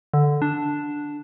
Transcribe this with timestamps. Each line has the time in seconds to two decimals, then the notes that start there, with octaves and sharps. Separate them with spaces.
0.14 D3
0.42 D4